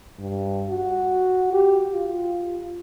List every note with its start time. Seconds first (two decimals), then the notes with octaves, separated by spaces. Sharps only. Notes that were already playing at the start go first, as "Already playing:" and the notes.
0.19 G2
0.70 F#4
1.53 G4
1.93 F4